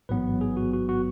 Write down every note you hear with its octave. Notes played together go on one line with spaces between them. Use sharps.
A1 G#2 F#3 B3 B4
G#4
F#4
F#4
F#4